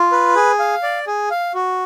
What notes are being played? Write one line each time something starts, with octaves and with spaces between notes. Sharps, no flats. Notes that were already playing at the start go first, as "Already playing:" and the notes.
Already playing: F4
B4
G#4
F5
D5
G#4
F5
F#4